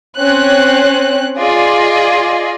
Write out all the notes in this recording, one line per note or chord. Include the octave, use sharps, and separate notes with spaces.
C4 C#4 F#6
F4 G#4 D5 D#5